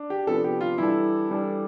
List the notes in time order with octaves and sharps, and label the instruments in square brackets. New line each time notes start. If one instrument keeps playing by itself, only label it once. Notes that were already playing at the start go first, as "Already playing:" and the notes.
Already playing: [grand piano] D4
[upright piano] G4
[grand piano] C3 F3 B3 D4 [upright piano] A4
[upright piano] G4
F4
[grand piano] E3 G3 D4 A4 [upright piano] E4
[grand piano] E3 G3 D4 A4